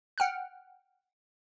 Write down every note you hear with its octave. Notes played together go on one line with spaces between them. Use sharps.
F#5 G5 F6 F#6